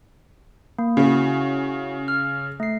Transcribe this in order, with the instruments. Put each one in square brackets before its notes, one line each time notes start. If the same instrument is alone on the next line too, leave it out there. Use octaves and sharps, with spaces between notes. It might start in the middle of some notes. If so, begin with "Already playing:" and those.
[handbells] A#3
[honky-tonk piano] C#3 [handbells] C#4 E4 F#4
[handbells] F6
A3 C7